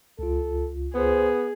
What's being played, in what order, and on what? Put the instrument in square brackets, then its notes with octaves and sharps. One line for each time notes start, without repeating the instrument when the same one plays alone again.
[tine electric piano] C#2 F4 [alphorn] A4
[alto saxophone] B3 [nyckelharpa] G#4 [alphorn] C5